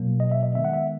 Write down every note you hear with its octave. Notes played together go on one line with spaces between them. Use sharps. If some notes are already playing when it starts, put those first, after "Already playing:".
Already playing: B2 F#3 A#3
D#5
E5
D#5
D#3 G#3 B3 E5
F#5
E5